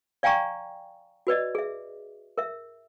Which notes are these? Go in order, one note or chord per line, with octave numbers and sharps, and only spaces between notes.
D5 F5 G5 G#5 A#5 C#6
F#4 B4 D5 D#5
G#4 E5
A#4 E5